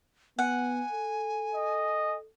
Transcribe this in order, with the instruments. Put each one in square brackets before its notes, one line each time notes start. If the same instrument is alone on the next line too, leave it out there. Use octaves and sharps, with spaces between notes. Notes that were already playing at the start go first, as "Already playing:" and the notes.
[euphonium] B3 [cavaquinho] F#5 [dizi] G#5
[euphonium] A4
[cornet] D#5